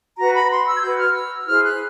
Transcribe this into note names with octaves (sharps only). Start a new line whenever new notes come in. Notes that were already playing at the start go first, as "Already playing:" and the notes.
F#4 B4 A#5
B5
C6
E6
G#6
F#4 B4 G6
F6
E6
E6
E4 G#4 C5 F6
F#6